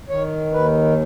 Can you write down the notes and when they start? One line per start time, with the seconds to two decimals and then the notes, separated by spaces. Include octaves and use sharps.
0.09 D#3 C#5
0.53 D#2 B4